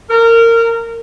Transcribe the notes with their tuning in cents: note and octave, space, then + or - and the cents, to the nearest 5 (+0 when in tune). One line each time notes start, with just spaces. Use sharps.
A#4 -20